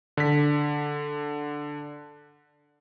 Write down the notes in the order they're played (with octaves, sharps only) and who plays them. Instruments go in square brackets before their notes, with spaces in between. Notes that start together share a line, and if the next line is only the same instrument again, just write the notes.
[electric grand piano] D3 B6